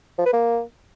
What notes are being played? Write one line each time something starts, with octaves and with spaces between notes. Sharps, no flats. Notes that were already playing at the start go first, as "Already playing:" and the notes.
F3
B4
A#3